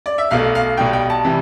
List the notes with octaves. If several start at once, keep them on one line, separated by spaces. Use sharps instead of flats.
D5
E5
B1 B2 A3 F5
F5
B1 B2 G3 G5
G5
A5
C3 E3 G3